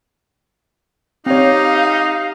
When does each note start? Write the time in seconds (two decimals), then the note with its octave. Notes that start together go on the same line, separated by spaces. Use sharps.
1.26 C4 D#4 G4 C#5 F5